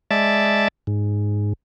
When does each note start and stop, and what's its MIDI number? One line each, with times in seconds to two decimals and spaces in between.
0.11 0.68 56
0.11 0.68 74
0.11 0.68 76
0.11 0.68 81
0.87 1.53 44